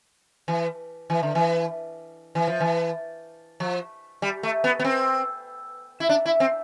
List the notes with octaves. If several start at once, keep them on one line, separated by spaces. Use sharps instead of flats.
E3
E3
D3
E3
E3
F3
E3
F3
G3
A3
B3
B3
C4
E4
D4
E4
C4